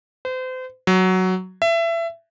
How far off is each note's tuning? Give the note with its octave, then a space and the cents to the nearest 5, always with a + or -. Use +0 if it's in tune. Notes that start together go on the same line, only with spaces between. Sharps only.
C5 -35
F#3 +5
E5 +25